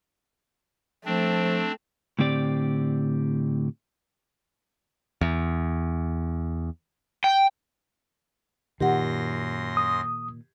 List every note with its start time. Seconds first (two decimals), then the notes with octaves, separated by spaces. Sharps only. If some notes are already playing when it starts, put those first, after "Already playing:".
1.06 F3 A3 C4 D4
2.19 A2 D3 C4 G4 D5
5.21 E2
7.24 G5
8.80 F#2 A#2 D#3 G4 F#5 C6 A#6
9.77 D#6